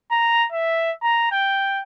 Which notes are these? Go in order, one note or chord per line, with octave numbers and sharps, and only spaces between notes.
A#5
E5
A#5
G5